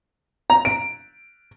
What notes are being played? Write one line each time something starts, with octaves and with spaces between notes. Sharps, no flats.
A#5
D7